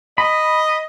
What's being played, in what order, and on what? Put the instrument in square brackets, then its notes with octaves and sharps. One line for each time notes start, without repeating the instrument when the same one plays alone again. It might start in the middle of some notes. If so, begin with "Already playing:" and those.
[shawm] D#5 [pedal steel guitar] B5